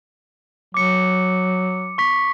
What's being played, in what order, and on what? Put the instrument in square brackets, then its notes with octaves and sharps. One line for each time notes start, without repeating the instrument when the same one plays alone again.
[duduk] F#3 [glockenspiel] D6 C#7
[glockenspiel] C#6 B6